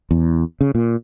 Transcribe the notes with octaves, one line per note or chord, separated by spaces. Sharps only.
E2
C#3
A#2